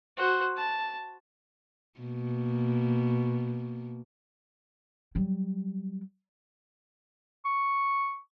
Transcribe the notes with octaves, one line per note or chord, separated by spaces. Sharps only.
F#4 C5
A5
B2 A#3
F#3 G3
C#6